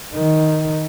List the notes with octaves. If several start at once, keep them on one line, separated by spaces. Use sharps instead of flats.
D#3